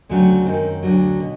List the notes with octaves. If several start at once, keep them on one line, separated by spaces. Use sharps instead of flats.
D2 C#3 F#3 A3 C4
F#2 D#3 G#3 C4
D2 D3 F#3
B2